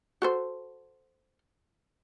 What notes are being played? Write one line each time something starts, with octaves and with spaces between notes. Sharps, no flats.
F#4 A4 C5